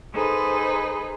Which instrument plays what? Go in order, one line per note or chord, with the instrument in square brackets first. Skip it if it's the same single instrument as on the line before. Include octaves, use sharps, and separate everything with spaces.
[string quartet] D#4 G#4 A4 B4 C5